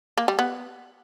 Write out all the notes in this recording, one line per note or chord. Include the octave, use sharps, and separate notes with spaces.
A#3
G3
B3